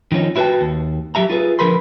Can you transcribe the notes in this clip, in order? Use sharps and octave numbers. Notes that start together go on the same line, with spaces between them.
D#3 F3 C#4 D#4
E4 F#4 B4 F5 G5 A5
D#2
F#3 G4 E5 A#5
F4 G#4 B4
D3 F3 A#4 B4 B5 C6